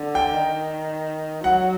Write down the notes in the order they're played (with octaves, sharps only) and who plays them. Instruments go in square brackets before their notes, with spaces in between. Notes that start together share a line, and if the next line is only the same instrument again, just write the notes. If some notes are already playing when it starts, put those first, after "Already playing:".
Already playing: [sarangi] D3
[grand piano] G5
[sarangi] D#3
[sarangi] F#3 [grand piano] F#5